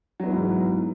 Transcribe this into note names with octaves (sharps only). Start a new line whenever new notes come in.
G#2 E3 F#3 B3